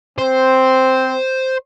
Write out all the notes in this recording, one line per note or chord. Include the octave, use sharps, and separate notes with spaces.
C4 C5